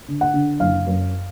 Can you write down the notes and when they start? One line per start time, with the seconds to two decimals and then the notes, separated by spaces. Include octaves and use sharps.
0.08 D3
0.21 F#5
0.34 D3
0.60 F#1 F5
0.87 F#2